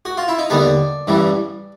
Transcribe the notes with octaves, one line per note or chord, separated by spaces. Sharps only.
F#4
F4
E4
D#4
D#2 D3 G3 B3 D4
A1 G2 E3 G3